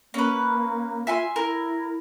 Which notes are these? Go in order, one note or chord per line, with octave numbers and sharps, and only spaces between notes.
A#3 C#4 B4
F4 E5 G#5 C6
E4 A#4